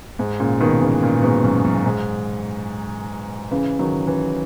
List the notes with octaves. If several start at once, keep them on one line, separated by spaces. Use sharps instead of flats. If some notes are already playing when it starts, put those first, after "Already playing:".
G#2
A#2 C#3
B2 D#3
C#3 E3
A#2 C#3
G#2 B2
F#2
F#2
A#2
G#2
C#3 E3
D#3 F#3
C#3 E3